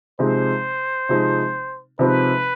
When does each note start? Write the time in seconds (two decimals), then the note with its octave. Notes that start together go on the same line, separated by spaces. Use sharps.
0.19 C3 F3 G#3 C4 D#4 C5
1.09 C3 F3 G#3 C4 D#4
1.99 C3 F3 G#3 C4 D#4 B4